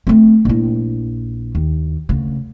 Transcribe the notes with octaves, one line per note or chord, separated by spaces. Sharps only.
A3 C4
A#1 E4
D#2
D2 C#3